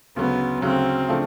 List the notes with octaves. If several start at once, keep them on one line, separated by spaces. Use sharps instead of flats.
D2 C#3 F#3 B3
D2 C#3 F#3 C4
C#3 F3 A3 D4